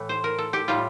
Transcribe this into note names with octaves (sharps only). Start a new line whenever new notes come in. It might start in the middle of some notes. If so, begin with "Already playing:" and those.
Already playing: A2 E3 A3
C5
A#4
A4
G4
A2 G3 F4